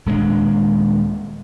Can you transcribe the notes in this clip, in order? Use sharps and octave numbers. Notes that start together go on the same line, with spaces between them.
D#1 G#3 A#3 D4